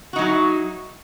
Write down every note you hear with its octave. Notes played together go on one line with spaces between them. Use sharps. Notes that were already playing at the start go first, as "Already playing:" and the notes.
F#3 D#4 E4 F#4